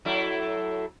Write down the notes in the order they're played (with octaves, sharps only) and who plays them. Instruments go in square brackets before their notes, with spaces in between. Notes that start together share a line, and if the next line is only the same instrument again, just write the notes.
[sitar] F#3 A3 E4